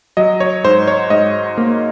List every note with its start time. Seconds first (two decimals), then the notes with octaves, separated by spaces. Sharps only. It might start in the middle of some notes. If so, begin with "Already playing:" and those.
0.17 F#3 D#5
0.40 C#5
0.64 G#2 C5
0.88 C#5
1.10 G#2 D#5
1.58 A#3